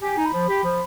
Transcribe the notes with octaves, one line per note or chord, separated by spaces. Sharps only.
G4 G#5
D#4
B5
F3
G4
F3